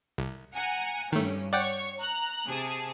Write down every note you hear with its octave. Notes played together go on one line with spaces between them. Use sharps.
C2
F#5 G#5 A#5
G2 D#3 A3 C#4
C#5 D5 F#5 G5 C#6
A#5 F#6
C3 G#4 A5